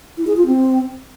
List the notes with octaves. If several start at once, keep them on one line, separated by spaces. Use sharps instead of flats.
E4
G#4
F4
C4